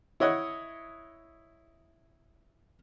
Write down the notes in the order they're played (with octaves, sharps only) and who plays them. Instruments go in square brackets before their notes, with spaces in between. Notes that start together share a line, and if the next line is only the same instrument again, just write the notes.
[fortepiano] E4 C#5 D#5 F#5